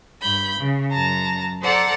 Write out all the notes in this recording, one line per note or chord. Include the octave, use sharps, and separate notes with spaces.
G2 B5 G6
C#3
F#2 A5 A#5
A4 C5 D5 F#5 A#5